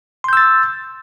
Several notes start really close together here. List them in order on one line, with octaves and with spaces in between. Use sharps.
C6 G6 E6 A6